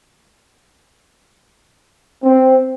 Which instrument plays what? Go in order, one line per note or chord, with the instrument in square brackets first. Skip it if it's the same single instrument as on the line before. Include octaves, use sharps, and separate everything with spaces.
[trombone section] C4